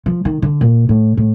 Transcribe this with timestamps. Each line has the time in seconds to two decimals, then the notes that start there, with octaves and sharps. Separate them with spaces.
0.06 F3
0.25 D#3
0.42 D3
0.61 A#2
0.89 A2
1.17 A2